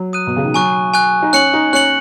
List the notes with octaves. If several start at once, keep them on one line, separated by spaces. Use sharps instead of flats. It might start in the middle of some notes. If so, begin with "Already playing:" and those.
Already playing: F#3
D#6 F#6 D#7
B2
C#3
D#3
F#3 G#5 C#6 F#6
G#5 C#6 F#6
D#4
C#4 F#6 C#7 F#7
D#4
C#4 F#6 C#7 F#7